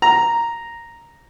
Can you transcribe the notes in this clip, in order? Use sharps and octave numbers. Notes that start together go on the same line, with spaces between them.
A#5